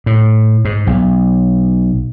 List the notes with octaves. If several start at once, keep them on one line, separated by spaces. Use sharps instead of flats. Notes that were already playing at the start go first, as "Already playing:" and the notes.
A2
G#2
B1